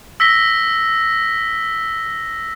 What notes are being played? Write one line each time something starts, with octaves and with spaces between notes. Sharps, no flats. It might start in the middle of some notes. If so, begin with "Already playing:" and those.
E6 A#6 B6 G7